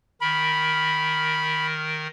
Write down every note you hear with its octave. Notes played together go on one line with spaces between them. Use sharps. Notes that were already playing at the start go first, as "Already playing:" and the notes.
D#3 A#4 B5